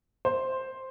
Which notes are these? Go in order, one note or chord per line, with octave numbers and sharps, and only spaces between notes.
C5